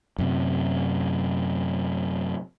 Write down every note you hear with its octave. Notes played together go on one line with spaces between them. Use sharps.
F#2 C3